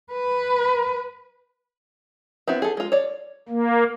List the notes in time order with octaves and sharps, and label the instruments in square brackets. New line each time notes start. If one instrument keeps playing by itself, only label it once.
[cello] B4
[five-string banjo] B3 C4 E4 F#4
G#4 A4
G#3 F4
C#5 D5
[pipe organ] A#3